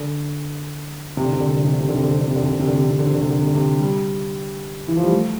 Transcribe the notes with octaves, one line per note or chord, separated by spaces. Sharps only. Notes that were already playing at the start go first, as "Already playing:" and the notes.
Already playing: D3
C3
D3
C3
D3
C3
D3
C3
D3
C3
D3
C3
D3
C3
D3
C3
D3
C3
D3
C3
D3
C3
D3
C3
D3
C3
D3
C3
D3
C3
D3
C3
G3
E3
F3
G3
A3